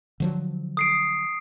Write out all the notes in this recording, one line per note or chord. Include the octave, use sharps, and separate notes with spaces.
D3 F3 F#3
D#6 C7 D7